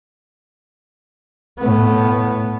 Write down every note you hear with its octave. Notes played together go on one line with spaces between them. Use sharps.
A2 B3